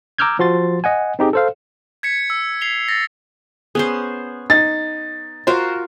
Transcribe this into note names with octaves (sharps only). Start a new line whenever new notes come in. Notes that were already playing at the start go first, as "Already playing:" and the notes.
A#5 D6 E6 F6 G6 G#6
F3 F#4 C6 A6
D#5 F#5 G#5
C4 D#4 G4 G#4
A4 C5 F5
G#6 B6 C#7
E6
B6 C7 F7 G7
A6 A#6
B3 C#4 G#4 C5
D#4 A6
F4 F#4 A#4 C5